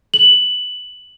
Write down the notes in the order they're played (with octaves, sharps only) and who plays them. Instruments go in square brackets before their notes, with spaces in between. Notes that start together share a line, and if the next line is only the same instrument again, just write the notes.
[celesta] F#7